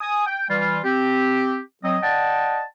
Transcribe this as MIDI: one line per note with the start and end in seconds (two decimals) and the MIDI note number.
0.01 0.25 80
0.01 0.25 87
0.26 0.44 79
0.49 0.79 52
0.49 0.79 55
0.49 0.79 65
0.84 1.58 60
0.84 1.58 67
1.84 1.97 54
1.84 1.97 60
1.84 1.97 75
2.02 2.62 74
2.02 2.62 75
2.02 2.62 78
2.02 2.62 79
2.02 2.62 81